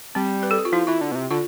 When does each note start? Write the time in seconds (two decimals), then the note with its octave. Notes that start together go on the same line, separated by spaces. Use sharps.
0.15 G3 C4
0.43 B4
0.51 A4
0.58 G4
0.65 F4
0.72 F3 E4
0.87 E3 F4
1.01 D3
1.12 B2
1.15 C3
1.31 D3 F4